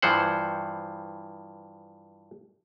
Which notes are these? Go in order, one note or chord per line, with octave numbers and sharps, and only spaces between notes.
G2 E3 F3 C5 F#5